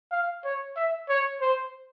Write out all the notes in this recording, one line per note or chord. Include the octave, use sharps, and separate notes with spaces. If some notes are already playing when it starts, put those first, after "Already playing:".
F5
C#5
E5
C#5
C5